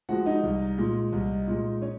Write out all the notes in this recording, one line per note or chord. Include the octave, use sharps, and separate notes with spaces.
F3 G#3 F#4 F#5
D#4 D#5
C2
A#2 G#3
C2
A#2 G#3
C#4 C#5